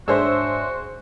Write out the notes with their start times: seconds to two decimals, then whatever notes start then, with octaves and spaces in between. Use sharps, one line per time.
0.08 G#2 D4 F#4 G#4 C5 C#5 E5 E6